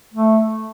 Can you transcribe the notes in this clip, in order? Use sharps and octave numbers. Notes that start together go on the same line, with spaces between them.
A3